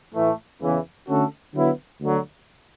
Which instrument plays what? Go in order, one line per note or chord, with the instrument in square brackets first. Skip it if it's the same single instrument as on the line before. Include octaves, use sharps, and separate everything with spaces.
[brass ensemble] A2 E3 A3
E2 C#3 E3
D3 A3 C#4 F#4 A4
D3 F#3 B3 E4
D2 D3 F#3